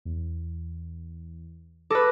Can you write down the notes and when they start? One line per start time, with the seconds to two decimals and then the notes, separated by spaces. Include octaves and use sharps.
0.05 E2
1.90 A4 B4 D6 D#6 A#6